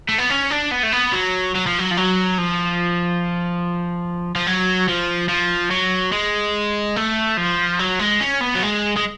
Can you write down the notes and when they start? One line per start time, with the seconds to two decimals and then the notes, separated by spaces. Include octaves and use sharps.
0.09 A3
0.19 B3
0.30 C#4
0.51 D4
0.72 B3
0.83 A3
0.92 B3
1.13 F#3
1.55 F#3
1.67 F3
1.79 F#3
1.91 F3
1.97 F#3
2.38 F3
4.35 F3
4.47 F#3
4.88 F3
5.29 F3
5.71 F#3
6.12 G#3
6.96 A3
7.37 F3
7.79 F#3
7.99 G#3
8.20 C#4
8.41 B3
8.55 F#3
8.62 G#3
8.96 G#3